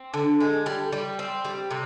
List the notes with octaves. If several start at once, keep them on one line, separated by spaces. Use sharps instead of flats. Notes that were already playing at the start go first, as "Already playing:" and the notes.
Already playing: C4
D3
G#3
G3
G3
C4
G3
C3